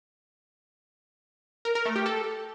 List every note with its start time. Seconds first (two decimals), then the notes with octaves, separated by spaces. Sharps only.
1.65 A#4
1.75 A#4
1.85 A3
1.96 G4
2.06 A4